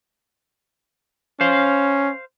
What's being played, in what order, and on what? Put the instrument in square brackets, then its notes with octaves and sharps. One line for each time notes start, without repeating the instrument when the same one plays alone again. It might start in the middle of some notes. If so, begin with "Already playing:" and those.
[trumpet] C#4 [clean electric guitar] C5 F5